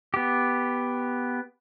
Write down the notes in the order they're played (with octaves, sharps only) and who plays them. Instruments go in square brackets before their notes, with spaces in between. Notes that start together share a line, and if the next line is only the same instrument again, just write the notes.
[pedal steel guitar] B3 G4